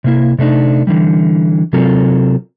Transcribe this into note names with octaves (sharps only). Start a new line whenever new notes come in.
C3 A#3 E4
C3 A3 D4 D#4
D3 E3 G3
C3 F#3 C4 F4 A4 A#4